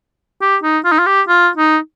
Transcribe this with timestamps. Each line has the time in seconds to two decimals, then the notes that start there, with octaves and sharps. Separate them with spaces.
0.41 G4
0.63 D#4
0.84 F4
0.92 D#4
0.99 F4
1.06 G4
1.28 F4
1.57 D#4